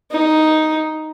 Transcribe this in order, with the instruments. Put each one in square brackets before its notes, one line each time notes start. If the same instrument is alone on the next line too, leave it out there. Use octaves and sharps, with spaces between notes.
[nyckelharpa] D#4